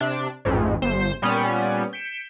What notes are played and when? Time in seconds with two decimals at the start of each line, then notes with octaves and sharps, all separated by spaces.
0.01 C3 D4
0.45 A1 F2 G#2
0.82 G1 C5
1.22 A#2 G3 B3 C#4
1.93 G6 B6 C#7 D7 E7